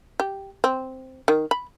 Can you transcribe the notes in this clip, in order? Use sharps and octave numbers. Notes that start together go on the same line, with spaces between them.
G4
C4
D#3
B5